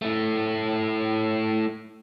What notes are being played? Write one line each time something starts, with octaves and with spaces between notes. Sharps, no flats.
A3 E4